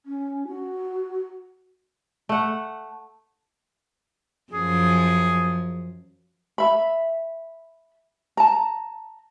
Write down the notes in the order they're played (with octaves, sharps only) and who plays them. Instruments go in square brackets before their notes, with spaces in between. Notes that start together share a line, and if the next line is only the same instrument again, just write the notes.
[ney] C#4
F#4
[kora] A3 F#5
[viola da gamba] F#2 F3 [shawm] G#4
[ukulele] E5 B5
A5 A#5